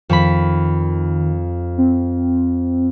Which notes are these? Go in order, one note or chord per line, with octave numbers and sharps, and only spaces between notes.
F2 D#3 B5
C4